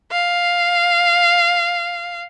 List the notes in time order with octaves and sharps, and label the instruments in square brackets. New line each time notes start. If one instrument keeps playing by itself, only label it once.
[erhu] F5